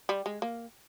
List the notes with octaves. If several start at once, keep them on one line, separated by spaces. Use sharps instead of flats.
G3
G#3
A#3